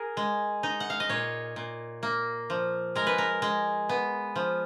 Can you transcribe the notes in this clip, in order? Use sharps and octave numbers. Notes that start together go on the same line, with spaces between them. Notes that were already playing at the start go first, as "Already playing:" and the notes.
Already playing: G#4 A#4
G#3
D#4
F#5
F5
D#5
A#2 C#5
A#2
A#3
F3
G#3 A#4
B4
A#4
G#3
B3
F3